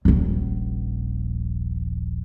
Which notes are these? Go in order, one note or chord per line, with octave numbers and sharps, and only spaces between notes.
D#1 A#1